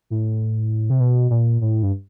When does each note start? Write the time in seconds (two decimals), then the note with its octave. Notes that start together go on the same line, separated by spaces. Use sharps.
0.10 A2
0.90 C3
1.00 B2
1.30 A#2
1.61 A2
1.83 G2